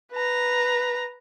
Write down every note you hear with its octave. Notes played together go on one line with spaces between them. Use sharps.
B4 A#5